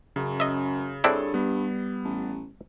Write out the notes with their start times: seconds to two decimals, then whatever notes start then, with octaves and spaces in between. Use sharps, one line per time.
0.16 F#2 C#3
0.40 D#5 E5
1.04 G2 C4 D4 E4 G#4 A4 C#5
1.34 G3 B3
2.05 A1